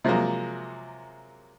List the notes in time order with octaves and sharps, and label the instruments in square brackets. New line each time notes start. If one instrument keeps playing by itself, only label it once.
[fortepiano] C3 F3 F#3 G#3 A#3